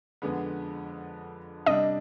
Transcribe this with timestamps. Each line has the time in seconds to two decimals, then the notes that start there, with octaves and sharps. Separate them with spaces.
0.22 F2 D3 G#3 B3
1.66 C3 G3 D4 D#5